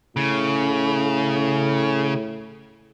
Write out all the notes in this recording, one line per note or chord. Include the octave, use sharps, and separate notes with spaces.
A2 C#3